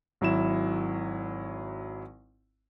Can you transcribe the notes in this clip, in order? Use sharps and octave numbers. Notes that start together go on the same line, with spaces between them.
G#1 F#3 E4 E7